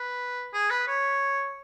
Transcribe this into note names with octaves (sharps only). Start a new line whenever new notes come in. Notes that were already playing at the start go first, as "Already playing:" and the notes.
Already playing: B4
G#4
B4
C#5